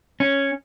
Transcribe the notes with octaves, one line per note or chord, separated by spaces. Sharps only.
C#4